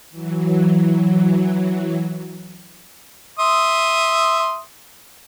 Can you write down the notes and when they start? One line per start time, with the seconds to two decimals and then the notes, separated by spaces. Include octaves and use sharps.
0.11 E3 F#3
3.39 E5 C6 D#6